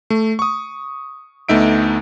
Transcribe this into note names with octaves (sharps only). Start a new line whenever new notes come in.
A3
C#6 D#6
D2 A3 B3 D#4 E5 D7